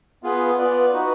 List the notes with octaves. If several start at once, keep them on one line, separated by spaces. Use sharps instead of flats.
B3 F4 G#4 B4
B3 F4 B4 D5
D#4 F#4 B4